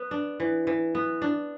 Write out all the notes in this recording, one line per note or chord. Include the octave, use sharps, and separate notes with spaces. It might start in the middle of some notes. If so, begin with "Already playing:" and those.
Already playing: B3
D4
E3
E3
B3
D4